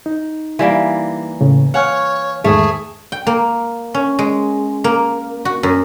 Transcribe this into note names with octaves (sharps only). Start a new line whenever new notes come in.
D#4
E3 G3 A#3
A2 C#3
C#5 F5 F#5 G#5 F6
E2 G#2 D#3 A3 G#4
G5
A#3
C#4
G#3
A#3
F#4
F#2